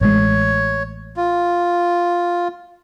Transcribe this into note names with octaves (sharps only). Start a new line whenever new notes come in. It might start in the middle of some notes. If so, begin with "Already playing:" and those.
A1 G#3 C#5
F4